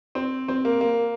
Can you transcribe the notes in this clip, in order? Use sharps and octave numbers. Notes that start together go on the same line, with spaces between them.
C4
C4
A#3
A#3